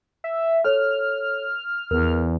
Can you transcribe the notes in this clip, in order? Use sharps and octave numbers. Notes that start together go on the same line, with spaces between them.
E5
A4 C#5 F6
E2 A#4